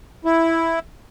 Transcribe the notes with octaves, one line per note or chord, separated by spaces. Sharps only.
E4